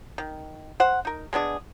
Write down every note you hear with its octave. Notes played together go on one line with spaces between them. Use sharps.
D#3
C5 F#5
D#4 A#4
G#3 B3 D4 G#4